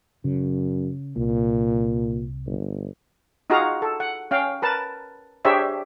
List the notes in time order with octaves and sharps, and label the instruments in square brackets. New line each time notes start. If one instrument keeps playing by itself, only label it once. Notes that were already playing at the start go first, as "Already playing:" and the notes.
[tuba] F#2 [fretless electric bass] C#3
[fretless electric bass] C2 [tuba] A#2
[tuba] G1
[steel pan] D#4 F4 F#4 G#4 F5 A#5
A4
F#5
C#4 F5 G5
A#4 B4 A5
D4 G4 G#4 C5 C#5 E5